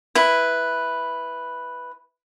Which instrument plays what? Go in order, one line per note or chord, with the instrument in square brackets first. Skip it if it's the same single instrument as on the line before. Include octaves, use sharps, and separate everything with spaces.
[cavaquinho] E4 B4